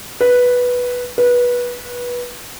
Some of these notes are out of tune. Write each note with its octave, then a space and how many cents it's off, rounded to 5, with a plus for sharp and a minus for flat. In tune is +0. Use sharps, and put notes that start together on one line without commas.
B4 -5
B4 -20